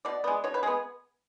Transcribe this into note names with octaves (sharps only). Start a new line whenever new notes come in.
B2 D5
G#3 B3
B2 C#5
B4
G#3 B3 G#4